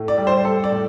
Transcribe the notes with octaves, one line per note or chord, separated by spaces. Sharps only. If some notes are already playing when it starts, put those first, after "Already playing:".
Already playing: A2
D5
G3
C5
G3 A4
D5
A2